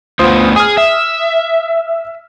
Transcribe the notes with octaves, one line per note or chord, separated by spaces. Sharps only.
D2 B3 F4 C5 D#6
G#4 D#6 F6
E5